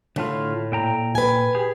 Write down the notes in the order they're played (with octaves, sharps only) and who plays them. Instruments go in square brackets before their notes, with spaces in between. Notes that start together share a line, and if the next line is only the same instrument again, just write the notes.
[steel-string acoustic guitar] A2 [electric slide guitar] D3 A3 F4
[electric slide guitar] A#2 G5 A#5
[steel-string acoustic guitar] B4 G#5
[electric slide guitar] G4 G#4